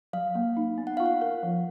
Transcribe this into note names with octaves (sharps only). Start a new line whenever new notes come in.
F#3 F5
A#3
D#4
B3
F#5
F4 F5
F#5
A#4
F3